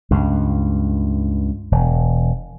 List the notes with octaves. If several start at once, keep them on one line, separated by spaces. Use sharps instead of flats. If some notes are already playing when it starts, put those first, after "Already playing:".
C#2 G2
E1